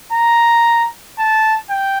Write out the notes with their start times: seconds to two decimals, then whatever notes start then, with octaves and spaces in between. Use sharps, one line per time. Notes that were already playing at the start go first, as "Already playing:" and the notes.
0.12 A#5
1.18 A5
1.70 G5